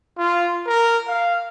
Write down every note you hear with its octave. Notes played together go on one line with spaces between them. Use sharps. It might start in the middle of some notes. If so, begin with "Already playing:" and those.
F4
A#4
F5